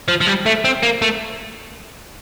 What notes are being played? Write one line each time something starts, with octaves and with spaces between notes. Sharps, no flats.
F3
F3
G3
A3
C4
A#3
A3